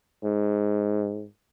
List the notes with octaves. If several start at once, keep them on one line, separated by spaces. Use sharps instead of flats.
G#2